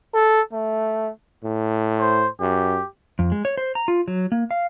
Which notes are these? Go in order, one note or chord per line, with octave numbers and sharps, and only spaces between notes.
A4
A3
A2
C5
F#2 G4
F2
G#3
C#5
C5
A#5
F4
F#3
A#3
F5